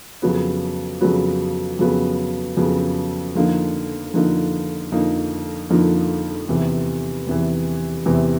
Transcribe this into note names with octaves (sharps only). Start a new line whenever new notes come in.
F2 C#3 F#3 B3
F2 C#3 F#3 B3
F2 C#3 F#3 B3
F2 C#3 F#3 B3
F2 D3 F3 A#3 D#4
F2 D3 F3 A#3 D#4
F2 D3 F3 A#3 D#4
F2 D3 F3 A#3 D#4
E2 C3 E3
E2 C3 E3
E2 C3 E3